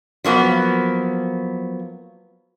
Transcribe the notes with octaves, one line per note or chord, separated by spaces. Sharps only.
F3 F#3 A#3 B3